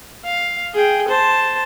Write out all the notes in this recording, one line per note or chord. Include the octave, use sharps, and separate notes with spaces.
F5
G#4 G5
C5 A5